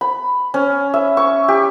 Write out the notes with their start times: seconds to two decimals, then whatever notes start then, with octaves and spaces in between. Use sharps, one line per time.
0.01 B5
0.54 C#4
0.94 E5
1.17 C#6
1.48 G4